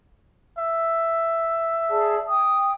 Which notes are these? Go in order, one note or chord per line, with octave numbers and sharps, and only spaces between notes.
E5
G#4 D5 A5
G5 D#6